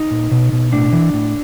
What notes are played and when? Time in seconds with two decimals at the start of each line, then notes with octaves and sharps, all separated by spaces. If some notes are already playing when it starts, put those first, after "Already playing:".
Already playing: D#4
0.11 A#2
0.31 B2
0.52 B2
0.73 A2 D4
0.93 E3
1.13 A2